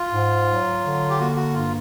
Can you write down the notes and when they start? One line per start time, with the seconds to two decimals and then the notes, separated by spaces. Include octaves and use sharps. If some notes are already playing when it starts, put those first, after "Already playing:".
Already playing: F4
0.13 G#2
0.48 F#3
0.83 D3
1.10 G4
1.19 A#3 F#4
1.36 F#4
1.54 G2 F4